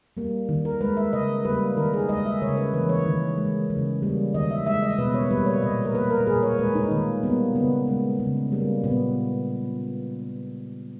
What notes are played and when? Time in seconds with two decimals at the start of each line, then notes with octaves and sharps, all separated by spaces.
0.17 G3 A#3
0.49 D#3
0.65 A#4
0.81 G#3 B4
0.97 E5
1.13 C#3 D#5
1.45 G3 A#3 B4
1.77 D#3 A#4
1.93 G#4
2.09 G#3 D#5
2.25 E5
2.42 C#3 C#5
2.57 B4
2.73 E3 A#3 B4
2.89 C#5
3.06 D#3
3.38 G#3
3.70 C#3
4.02 G3 A#3
4.34 D#3 D#5
4.51 E5
4.66 G#3 E5
4.82 D#5
4.98 B2 B4
5.14 C#5
5.31 G3 A#3 B4
5.46 C#5
5.62 A#2 D#5
5.85 A#4
5.95 A#3 B4
6.11 A#4
6.27 A#2 G#4
6.43 C#5
6.59 G#3 B4
6.75 D#4
6.91 D#3 A#3
7.23 G3 A#3 B3
7.55 C#3 B3
7.87 G#3
8.20 C#3
8.52 G3 A#3
8.84 A#2 B3